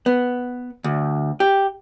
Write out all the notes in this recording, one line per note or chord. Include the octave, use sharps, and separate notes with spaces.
B3
D2
G4